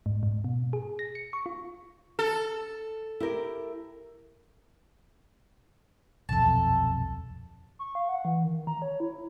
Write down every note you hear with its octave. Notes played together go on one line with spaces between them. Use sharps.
G#2
G#2
B2
G#4
A#6
C#7
C#6
F4
A4
E4 G4 A#4
D#1 B1 F2 A4 A5
C#6
F5
F#5
E3
D#3
A#5
C#5
E4